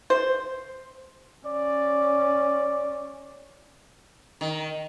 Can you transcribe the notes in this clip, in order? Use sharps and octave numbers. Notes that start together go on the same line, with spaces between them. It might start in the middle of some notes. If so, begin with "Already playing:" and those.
C5
C#4 D5
D#3